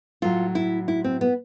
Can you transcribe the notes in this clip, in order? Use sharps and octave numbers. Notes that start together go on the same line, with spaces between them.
A2 F#3 F4
E4
E4
C4
B3